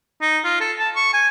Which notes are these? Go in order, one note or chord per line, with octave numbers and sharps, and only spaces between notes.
D#4
F4
A4
A5
C#6
G#5